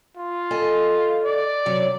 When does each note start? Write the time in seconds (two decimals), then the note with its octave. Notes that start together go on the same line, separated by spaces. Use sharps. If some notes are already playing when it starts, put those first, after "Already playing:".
0.17 F4
0.51 A4 D#5 G#5
1.24 D5
1.66 F#2 C3 F#3